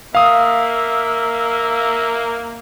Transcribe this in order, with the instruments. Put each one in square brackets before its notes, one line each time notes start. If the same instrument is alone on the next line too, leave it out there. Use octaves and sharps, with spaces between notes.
[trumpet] A#3 [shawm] E5 [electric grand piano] F5 D#6